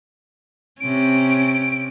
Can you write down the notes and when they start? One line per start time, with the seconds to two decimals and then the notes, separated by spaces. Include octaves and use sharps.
0.80 C3 C#4 D7